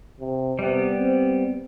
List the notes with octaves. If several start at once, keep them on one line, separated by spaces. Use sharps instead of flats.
C3
C3 G3 B3
C4